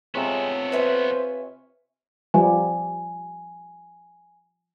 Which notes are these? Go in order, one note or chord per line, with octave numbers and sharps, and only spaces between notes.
C3 G#3 B3 F4 A4 C#5
B4 C5 E5 G#5
F3 G3 G#5